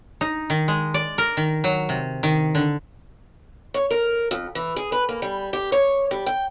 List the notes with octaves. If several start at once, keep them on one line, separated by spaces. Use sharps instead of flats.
D#4
D#3
G#3
D5
A#4
D#3
F#3
C3
D#3
D3
C#5
A#4
F2
E3
G#4
B4
A#3
G3
G4
C#5
G3
G5